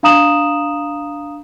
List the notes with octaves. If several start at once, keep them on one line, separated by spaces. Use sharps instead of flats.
D4 F5 A#5 D#6 E7 F#7